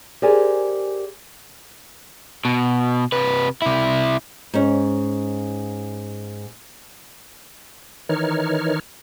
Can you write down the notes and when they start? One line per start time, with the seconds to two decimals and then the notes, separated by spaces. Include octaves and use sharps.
0.22 G4 G#4 A#4 C5 D5 G#5
2.45 B2
3.12 C3 B4
3.62 C3 E4
4.54 G#2 C#4
8.09 D#3 E3 D#4 C#5 F6